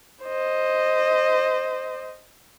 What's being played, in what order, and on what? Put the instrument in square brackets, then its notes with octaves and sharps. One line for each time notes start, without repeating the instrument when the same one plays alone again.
[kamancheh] C5 D#5